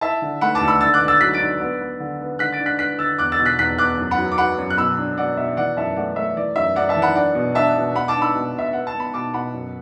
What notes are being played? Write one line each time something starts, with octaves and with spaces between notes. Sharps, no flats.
E4 E5 A5
D3
A3 F#5 B5
A5 D6
D2
B5 E6
D3 E6 A6
D6 F#6
D3
E6 A6
F#3 F#6 B6
A6 D7
D4
B3
B3
D3
B3
D3 F#6 B6
A6 D7
D4
F#6 B6
D4 F#6 B6
D3 E6 A6
E2 D6 F#6
E6 A6
B2
F#6 B6
E2 F#6 B6
E2 D6 F#6
F#2
F#5 B5
F#3
D6
F#3 F#5 B5
F#2
F#6
B2 B5 E6
D4
B2 D5 F#5
B2 E5
E3 D5 F#5
F#2 E5 A5
A3 D5 F#5
A3 E5
E3 D5
F#2 E5
F#2 D5 F#5
E5 A5
E3
F#5 B5
D4 D5 F#5
B2
D4 E5 A5
B2
B2 F#5 B5
A5 D6
D4
B5 E6
B2
B2 E5
B3 F#5
A5
B3
B5
B2 A5 D6
B2 F#5 B5
F#2